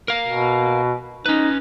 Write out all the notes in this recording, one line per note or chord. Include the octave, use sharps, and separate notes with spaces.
A#4 F5
B2
C#4 D#4 B4